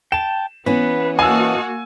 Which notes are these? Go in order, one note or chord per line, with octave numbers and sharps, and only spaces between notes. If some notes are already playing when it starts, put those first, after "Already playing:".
G5 A5 E7
E3 B3 C#4 B4
A#3 F#4 D#5 F5 G#5 A5 E6